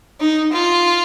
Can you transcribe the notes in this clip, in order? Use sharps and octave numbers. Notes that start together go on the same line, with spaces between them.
D#4
F4